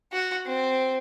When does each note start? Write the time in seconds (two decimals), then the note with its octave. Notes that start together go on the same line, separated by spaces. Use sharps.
0.12 F#4
0.46 C4